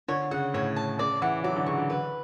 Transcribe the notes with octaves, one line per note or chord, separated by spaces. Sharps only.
D3 C#5
C#3 F#5
A2 C#5
A5
C#3 D5
E3 F#5
F#3 D5
D3
C#3 C#6
D3
B4